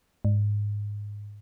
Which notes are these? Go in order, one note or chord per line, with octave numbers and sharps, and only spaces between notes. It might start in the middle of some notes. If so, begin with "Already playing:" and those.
G#2